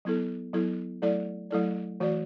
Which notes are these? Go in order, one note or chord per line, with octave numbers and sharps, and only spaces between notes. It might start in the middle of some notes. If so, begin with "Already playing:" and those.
F#3 B3 E4 A4
F#3 B3 E4 A4
F#3 A3 E4 A4 D5
F#3 A3 E4 A4 D5
E3 A3 F#4 D5